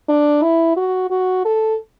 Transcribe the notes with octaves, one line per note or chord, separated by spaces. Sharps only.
D4
E4
F#4
F#4
A4